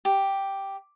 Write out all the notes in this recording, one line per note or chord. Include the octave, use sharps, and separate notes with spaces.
G4